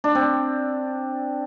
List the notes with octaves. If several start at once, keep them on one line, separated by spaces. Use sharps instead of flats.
D4
C4